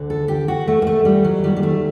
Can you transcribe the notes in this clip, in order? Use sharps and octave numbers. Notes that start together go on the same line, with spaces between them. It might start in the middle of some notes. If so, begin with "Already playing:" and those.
Already playing: D2 D3
A4
G4
F#4
A3
A#3
A3
G3
F#3
D#2 D#3 G3
G3
A3